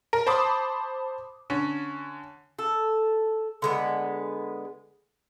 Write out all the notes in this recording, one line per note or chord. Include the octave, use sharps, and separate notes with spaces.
A#4
C5 A5 B5 D6 D#6
D3 C#4
A4
D3 G#3 B3